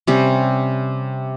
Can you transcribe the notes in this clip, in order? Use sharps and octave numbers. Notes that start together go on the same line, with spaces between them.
C3 G3 C#4 C5